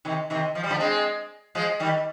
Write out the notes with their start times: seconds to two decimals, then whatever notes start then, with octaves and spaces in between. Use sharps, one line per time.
0.05 C3 D#3
0.30 C3 D#3
0.55 F3
0.63 G3
0.70 D3 F3
0.80 G#3 C4
1.55 F3 G#3
1.80 D#3 G3